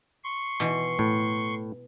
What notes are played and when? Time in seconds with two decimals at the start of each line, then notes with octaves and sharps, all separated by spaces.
0.24 C6 C#6
0.60 B2 E3
0.99 A2